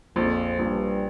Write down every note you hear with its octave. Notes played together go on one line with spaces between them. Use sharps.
A#1 F2
A#1 G2